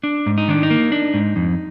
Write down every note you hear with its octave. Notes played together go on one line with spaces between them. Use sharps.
D4
G#2
D#4
D#3 D4
D#4
A#3
D4
G#2
F2